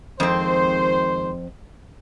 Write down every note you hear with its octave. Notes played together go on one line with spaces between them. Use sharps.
F2 D#3 G#3 C4 C5